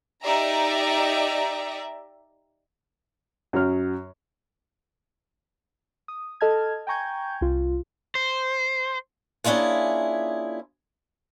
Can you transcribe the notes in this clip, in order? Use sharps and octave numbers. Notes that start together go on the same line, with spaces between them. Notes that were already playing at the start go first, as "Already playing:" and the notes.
D#4 G4 D5 E5 A#5
F#2 F#3 F6
D#6
A4 D#5 A5 F6 G#6
G5 G#5 A#5 C#6 G6 G#6
C2 F4
C5
A#3 C#4 D4 E4 F4 G#4